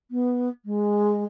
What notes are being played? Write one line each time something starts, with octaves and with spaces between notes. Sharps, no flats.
B3
G#3